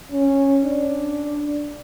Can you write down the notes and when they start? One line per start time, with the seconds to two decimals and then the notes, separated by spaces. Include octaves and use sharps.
0.12 C#4
0.64 D4